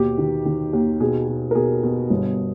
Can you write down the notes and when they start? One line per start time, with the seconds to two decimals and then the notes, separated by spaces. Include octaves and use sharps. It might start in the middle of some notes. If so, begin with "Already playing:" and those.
Already playing: D#2 B2 G4
0.18 D#3
0.45 D#3
0.73 D#2
1.00 B2 G#4
1.28 B2
1.51 A#4
1.55 B2 G#4
1.83 B2
2.10 G1